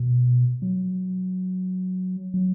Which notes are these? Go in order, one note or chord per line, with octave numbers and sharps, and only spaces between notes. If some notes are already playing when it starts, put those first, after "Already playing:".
Already playing: B2
F#3
F#3